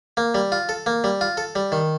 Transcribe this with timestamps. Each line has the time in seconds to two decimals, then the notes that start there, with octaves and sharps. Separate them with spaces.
0.17 A#3
0.34 G3
0.52 F4
0.69 A4
0.86 A#3
1.04 G3
1.21 F4
1.37 A4
1.55 G3
1.72 D#3